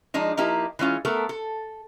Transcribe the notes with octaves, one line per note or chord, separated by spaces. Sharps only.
F3 G#3 D4 D#4
F3 A#3 D#4 E4 G4
E3 G#3 C#4 F4
A3 B3 A4 A#4
A4